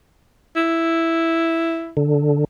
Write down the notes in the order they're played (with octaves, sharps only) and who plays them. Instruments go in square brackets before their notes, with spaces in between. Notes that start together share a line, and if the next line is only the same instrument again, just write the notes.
[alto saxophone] E4
[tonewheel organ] D3